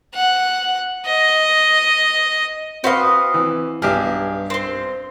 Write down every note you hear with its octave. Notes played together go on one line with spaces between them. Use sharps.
F#5
D#5
C4 F#4 B4 C5 D#5 F5
E3
B1 G2 G4 G#4 F6
C4 C5